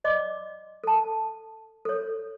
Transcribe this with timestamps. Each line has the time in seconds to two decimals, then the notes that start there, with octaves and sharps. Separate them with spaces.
0.04 D5 D#5 C6 D6
0.84 A4 A5
1.85 A4 C#5